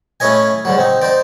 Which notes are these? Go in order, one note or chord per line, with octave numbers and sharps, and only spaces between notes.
A3 C#4 E4 C#5 D#5 G#5
G#2 D3 F#3
C4 D#4
D#4 C5 D5